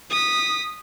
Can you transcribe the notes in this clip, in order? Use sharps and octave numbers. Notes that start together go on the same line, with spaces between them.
D#6 B6